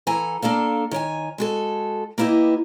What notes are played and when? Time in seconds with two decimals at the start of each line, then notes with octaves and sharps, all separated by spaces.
0.07 E3 A4 F#5 G#5 A#5
0.42 A#3 D4 A4 F5
0.91 D#3 C#5 G5 G#5
1.38 G#3 F#4 A4
2.18 A#3 B3 E4 G4 D#5